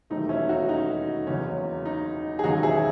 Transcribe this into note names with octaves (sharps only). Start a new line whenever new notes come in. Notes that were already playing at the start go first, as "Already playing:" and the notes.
E1 D#2 D#3 F#3 A3 D#4
C#4 E4
D#4 F#4
D#4 F#4
F#1 E2 C#3 F#3 C#4
D#4
G#4
E1 D#2 C#3 F#3 D#4 F#4
E4 G#4